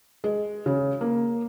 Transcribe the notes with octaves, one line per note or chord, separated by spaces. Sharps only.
G#3
C#3
A#3